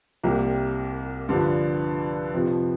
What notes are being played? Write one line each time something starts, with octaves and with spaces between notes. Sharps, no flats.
C2 C3 G3 A#3
G2 D3 F3
F2 C3 F3